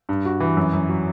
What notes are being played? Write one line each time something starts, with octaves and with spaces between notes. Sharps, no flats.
G2
F#4
E3
F#2
F#2
F#3